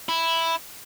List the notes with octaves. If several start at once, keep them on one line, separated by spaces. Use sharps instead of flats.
E4